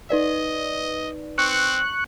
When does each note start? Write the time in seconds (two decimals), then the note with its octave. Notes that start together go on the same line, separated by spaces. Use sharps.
0.10 D#4 B4 D5 D#5
1.38 C4 C#6 F#6